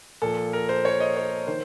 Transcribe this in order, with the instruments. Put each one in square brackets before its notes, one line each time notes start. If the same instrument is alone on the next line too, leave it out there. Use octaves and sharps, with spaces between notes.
[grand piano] A#2 F3 A4
A#4
C5
C#5
D#5
C#5
D#3 C5